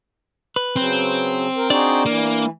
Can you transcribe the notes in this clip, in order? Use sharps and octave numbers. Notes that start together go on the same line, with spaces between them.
B4
C#3 F#3 C4
A#4
D4 D#4 F#4 G#4 D5
E3 A#3